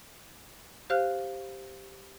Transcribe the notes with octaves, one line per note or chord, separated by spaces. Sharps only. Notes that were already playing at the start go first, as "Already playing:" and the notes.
G4 C5 F5 F6 F#6